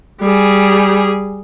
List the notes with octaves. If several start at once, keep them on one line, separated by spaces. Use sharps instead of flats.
G3 G#4